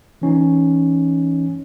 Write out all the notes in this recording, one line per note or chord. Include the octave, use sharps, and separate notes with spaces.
E3 C#4 D#4